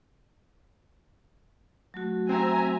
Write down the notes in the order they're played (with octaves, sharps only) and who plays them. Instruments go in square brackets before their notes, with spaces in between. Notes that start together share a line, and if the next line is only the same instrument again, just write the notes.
[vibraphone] F#3 A3 F#4
[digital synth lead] C4 [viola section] E5 G#5 A#5